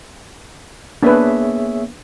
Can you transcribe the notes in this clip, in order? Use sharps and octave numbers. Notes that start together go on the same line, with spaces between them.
A#3 B3 D4 G#4 B4 C#5 E5